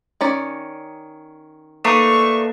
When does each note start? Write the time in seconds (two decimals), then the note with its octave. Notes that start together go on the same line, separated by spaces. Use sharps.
0.21 D#3 C#4 D5
1.84 A3 A#3 D4 D#4 B4 C#6 C7